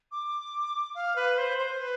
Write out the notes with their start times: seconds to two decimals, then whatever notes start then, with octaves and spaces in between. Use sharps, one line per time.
0.11 D6
0.95 F5
1.16 B4
1.38 C5
1.58 C5
1.79 B4